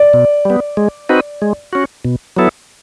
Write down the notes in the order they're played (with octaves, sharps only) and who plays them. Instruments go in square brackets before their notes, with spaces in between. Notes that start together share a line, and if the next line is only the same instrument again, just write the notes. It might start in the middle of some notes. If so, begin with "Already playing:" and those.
Already playing: [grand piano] D5
[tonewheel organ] B2
G3 B3
G#3
C4 D#4 F#4 B4
G#3
C#4 F#4
B2
F#3 B3 E4 A4